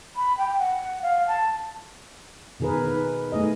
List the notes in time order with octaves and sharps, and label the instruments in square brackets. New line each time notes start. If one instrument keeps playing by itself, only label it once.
[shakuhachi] B5
G5
F#5
F5
A5
[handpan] B2 D#3 G#4 A#4 B4
D#3 B4
A3 D#4 G#4 D#5